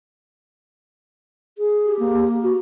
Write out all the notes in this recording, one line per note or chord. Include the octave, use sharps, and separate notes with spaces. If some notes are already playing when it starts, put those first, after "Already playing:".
G#4
G4
A#3
F#4